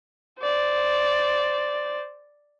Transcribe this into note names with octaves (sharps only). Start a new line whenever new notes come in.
C5 D5